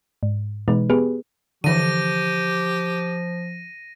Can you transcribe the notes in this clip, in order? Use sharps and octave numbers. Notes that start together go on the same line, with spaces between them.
G#2
B2 E3 G#3 D#4 B4
B3 G4 G#4 B4
D3 E3 F3 G4 A#6 D#7